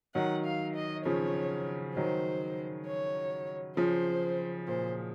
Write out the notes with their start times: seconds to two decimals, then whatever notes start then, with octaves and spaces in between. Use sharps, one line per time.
0.15 D#3 F#3 F#5
0.46 F5
0.75 D#5
1.05 C#3 F3 C#5
1.96 D#3 F#3 C5
2.87 C#5
3.77 C#3 F3 C5
4.67 A#2 C5